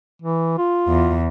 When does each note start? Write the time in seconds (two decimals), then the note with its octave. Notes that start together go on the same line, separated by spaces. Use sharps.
0.22 E3
0.58 F4
0.88 E2